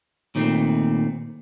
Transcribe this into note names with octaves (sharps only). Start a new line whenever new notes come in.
A#2 D#3 A3 C4